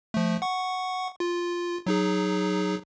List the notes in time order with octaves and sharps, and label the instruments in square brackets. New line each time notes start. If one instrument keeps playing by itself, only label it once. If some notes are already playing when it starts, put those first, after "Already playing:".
[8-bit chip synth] F3 A3
F#5 C#6
F4
F#3 D#4 G#4